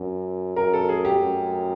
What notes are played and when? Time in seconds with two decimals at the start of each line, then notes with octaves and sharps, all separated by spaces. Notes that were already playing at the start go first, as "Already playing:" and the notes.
Already playing: F#2
0.56 F#2 A#4
0.74 A4
0.89 G#4
1.05 G4
1.20 F#2